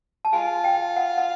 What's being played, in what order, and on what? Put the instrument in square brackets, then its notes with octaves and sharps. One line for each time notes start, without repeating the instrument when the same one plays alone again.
[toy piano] A5
[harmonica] G#3 F4 [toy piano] G#5
[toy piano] G5
F#5
F#5